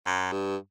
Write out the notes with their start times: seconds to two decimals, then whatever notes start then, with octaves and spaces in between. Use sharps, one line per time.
0.06 F#2
0.32 G2